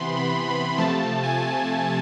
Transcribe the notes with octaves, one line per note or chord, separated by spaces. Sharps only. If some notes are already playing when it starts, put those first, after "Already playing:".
Already playing: C3 E3 B3 B5 C6
B5
B5
C3 F3 A3 A5
G#5